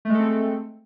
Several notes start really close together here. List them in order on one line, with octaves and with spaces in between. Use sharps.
A3 G#3 A4 C4